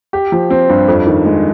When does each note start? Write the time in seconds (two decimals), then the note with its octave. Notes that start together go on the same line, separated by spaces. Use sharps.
0.13 G4
0.32 F3
0.50 C4
0.69 G2
0.88 F2
1.07 D#3
1.25 G#3